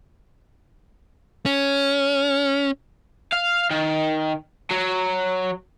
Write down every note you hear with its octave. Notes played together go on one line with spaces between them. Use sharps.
C#4
F5
D#3
F#3